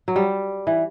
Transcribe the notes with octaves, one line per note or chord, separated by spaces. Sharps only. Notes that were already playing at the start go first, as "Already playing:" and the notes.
F#3
G3
E3